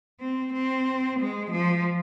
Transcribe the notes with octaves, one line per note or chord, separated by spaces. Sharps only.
C4
C4
G#3
F3